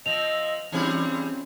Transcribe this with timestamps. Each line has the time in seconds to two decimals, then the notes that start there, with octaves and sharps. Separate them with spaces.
0.06 F3 C4 D#5 F7
0.72 C#3 E3 F3 G3 C4 D#4 G#4